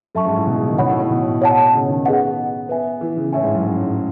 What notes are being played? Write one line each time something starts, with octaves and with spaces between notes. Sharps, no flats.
F#2 A4 E5 A5 C#6
G#2
A2
B2
C#3
D#3
B2 C#5 F#5 B5
A2
A2
B2
C#5 F#5 A5
C#3
D#3
B3 G#4 D#5 F#5
B3 B4 E5 G#5
E3
C#3
A2 C#5 E5 G#5
G#2
F#2
G#2
G#2